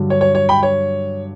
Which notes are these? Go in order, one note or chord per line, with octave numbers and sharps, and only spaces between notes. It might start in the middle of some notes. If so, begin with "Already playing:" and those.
Already playing: G2 D3 F#3
C#5
C#5
C#5
G5 B5
C#5